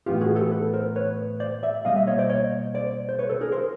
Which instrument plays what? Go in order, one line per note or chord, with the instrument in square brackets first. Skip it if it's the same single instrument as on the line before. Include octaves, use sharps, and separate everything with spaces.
[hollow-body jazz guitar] A2 E3 G3 B3 D4 F4 G4
F#4 G#4
G4 A4
A4 B4
A#4 C5
B4 C#5
C5 D5
D5 E5
B2 G3 A#3 D#5 F5
E5
C#5 D#5
C5 D5
C#5 D#5
C5 D5
C5
B4 C#5
A4 B4
G#4 A#4
A#4 C5